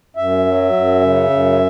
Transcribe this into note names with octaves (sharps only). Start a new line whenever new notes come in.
F#2 E5
F#3
F#2
C#3
F#2